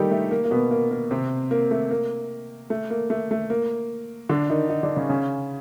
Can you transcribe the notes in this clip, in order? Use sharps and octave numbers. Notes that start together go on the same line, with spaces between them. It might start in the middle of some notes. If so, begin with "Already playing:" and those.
Already playing: D#3 G3 A3 A#3 D#4 G4 A4
A3
A#3
A#3
B2 B3
A#3
A#3
C3 C4
A#3
A3
A#3
A3
A#3
A3
A3
A#3
D3 D4
D#3 D#4
D#3 D#4
D3 D4
C#3 C#4
C#3 C#4